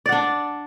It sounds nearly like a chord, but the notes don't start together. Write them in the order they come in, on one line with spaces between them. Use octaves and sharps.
D5 F#5 D4